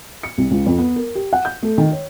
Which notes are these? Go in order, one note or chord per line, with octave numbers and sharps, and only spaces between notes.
C#7
C2
C#2
F2
B3
A#4
G4
F#5
G6
A3
D#3
C#5